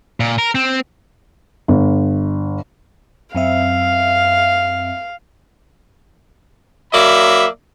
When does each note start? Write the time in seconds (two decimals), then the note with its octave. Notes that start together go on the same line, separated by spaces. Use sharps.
0.20 A#2
0.39 A#4
0.55 C4
1.68 G1
3.35 F#2 C4 E5 F5
6.93 F#3 A#3 D5 E5 B5